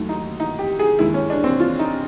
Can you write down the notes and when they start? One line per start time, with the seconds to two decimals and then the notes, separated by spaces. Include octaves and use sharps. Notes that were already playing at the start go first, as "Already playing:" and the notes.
Already playing: D#2 D#3 F#3 A3
0.09 D#4
0.40 D#4
0.59 G4
0.79 G#4
0.99 D#2 D#3 G#3 E4
1.14 C#4
1.30 D4
1.44 C4
1.60 F4
1.79 D#4